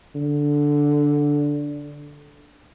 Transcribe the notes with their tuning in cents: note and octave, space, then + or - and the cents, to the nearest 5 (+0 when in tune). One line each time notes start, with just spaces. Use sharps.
D3 -5